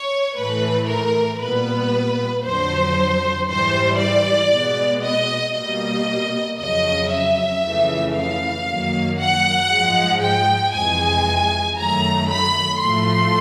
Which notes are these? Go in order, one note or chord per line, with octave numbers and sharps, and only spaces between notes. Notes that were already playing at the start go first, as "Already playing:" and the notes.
Already playing: C#5
A2 E3 A3 B4
A#4
A#2 G3 B3 B4
F2 D3 F#3 C5
G#2 E3 G3 C5
D5
B2 G#3 B3
D#5
B2 G3 A#3 D#5
F2 C#3 F#3 D#5
E5
F2 C#3 E3 A3
F5
F#2 D#3 F#3 A#3
F#5
G#2 F3 G#3
G5
F2 C3 E3 G#3 G#5
F#2 D#3 F#3 A3 A#5
B5
A2 F3 A3 C6